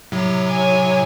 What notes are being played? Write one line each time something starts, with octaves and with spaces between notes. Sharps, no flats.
A2 C3 F#3
C#5 G#5